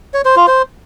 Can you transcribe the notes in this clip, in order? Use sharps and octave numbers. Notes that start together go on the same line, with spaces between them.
C#5
C5
F4
C5